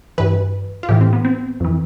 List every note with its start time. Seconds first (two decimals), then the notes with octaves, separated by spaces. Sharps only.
0.18 G2 E3 B4
0.83 F4
0.89 A2 E3 G4
1.01 C4
1.13 B3
1.25 C4
1.60 F2 E3